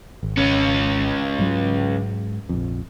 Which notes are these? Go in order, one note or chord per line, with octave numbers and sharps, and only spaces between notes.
G#1
C#2 C#4
G#2 F#3 G#3
A#1 F2